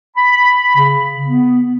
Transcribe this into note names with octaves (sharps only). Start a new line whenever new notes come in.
B5
C#3
B3